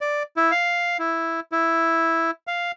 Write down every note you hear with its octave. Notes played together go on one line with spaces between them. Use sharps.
D5
E4
F5
E4
E4
F5